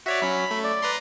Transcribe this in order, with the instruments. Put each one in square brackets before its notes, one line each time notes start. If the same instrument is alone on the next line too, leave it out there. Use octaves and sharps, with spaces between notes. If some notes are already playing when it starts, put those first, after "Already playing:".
[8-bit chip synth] F#4 C#5 D5 [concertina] E5
[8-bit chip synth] F#3 C#4 [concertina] B5
[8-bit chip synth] A3
[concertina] D5
[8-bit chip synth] B4 A#5 C6